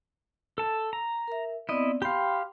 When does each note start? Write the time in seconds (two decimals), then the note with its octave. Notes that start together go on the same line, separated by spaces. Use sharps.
0.58 A4 A5
0.93 A#5
1.28 A#4 E5
1.69 B3 C4 E4 D5 D#5
2.02 G4 F5 G5 B5 C6